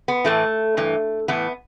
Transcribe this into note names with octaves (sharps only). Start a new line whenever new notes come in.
B3
A2 E3 A3
G2 E3
A2 E3 B3